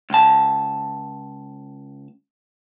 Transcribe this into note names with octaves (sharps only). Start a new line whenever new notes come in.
C#2 A5